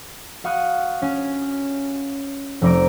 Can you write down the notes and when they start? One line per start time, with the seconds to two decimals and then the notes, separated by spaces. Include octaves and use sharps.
0.44 F#4 F5 C#6 D#6 F#6
1.02 C#4
2.61 F1 C4 D5 A#5 D7